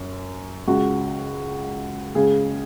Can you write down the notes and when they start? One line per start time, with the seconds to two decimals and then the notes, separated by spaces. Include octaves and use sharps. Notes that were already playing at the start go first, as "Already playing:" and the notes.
Already playing: F#2
0.67 C#2 C#3 F#4
2.15 C#2 C#3 G#4